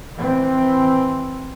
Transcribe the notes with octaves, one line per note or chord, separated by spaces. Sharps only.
E3 C4